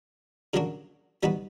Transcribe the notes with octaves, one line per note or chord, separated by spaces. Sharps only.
C#3 F#3 A#3 D4 F#4
G3 B3 D#4 F#4 B4